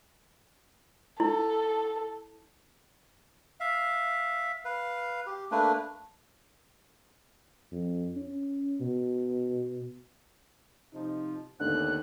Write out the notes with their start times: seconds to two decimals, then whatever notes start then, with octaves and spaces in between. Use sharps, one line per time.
1.20 E4 A4
3.60 E5 F5
4.65 B4 F5
5.27 G4
5.52 A3 A#3 D4 B4
7.72 F2
8.16 C#4
8.80 B2
10.93 C3 F3 D#4
11.60 D#2 D3 D#3 A3 B3 F#6